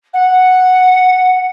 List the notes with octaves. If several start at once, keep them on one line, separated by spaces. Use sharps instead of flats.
F#5